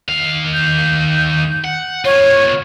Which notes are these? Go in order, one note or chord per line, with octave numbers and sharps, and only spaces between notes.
D#2 F5
G6
F#5
B3 F4 C#5